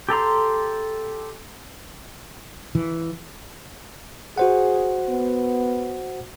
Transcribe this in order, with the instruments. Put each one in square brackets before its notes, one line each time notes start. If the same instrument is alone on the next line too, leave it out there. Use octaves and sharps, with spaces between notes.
[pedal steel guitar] G4 A4 A#5 C6
[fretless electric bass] E3
[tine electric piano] F#4 C5 F#5 [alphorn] G#4
[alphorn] B3